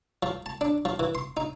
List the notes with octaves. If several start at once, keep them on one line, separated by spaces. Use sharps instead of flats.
F3
A5
D4
F3
E3
C6
D#4